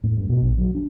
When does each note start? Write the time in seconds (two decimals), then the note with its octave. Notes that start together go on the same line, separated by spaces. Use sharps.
0.04 A2
0.17 G2
0.29 B2
0.42 A#1
0.58 F#3
0.75 D4